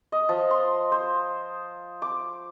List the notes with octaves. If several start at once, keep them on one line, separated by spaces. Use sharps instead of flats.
D#5
F3
C6
C5
D6